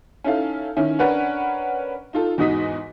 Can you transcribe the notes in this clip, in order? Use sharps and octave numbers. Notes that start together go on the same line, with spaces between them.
C#4 D#4 E4 A4 F5
D#3 C#4 E4
C#4 D4 A#4 B4 C#5 F#5
D#4 F4 A4
E2 G#2 F#4 D#5 D#6 B6